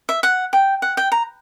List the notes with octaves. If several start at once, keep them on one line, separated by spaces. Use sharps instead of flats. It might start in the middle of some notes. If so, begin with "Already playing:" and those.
E5
F#5
G5
F#5
G5
A#5